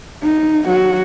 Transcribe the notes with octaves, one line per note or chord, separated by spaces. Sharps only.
D#4
F#3 F#4